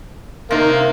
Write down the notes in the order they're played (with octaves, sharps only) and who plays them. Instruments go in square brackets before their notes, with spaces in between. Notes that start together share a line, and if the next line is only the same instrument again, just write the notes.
[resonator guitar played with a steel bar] C3 D#4 [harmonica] A#3